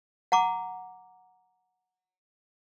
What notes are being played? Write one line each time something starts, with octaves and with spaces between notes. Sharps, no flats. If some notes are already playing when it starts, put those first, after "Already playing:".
F#5 A#5 D6